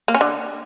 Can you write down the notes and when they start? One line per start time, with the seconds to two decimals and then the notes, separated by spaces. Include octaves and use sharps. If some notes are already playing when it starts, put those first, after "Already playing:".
0.08 A#3
0.15 C#4
0.21 D3